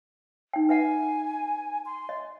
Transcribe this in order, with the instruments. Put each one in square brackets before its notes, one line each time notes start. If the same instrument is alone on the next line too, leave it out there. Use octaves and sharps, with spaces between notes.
[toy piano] D#4 G5
[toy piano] B4 E5 F#5 [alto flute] G#5
[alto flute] C6
[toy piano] D#5